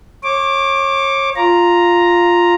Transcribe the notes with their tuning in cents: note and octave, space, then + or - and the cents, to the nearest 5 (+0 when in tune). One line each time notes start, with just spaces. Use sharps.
C#5 -30 D6 +0
F4 +0 A#5 +0